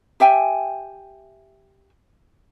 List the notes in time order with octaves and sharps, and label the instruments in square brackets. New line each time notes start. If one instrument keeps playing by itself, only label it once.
[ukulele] G4 E5 G5 G#5